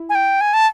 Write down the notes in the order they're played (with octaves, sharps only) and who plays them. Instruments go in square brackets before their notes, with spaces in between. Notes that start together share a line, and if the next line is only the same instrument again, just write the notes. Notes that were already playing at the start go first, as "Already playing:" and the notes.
Already playing: [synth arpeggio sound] E4
[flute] G#5
G5
G#5
A5